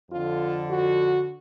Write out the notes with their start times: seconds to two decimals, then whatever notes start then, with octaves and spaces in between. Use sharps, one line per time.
0.10 F2 D3 F4
0.69 F#4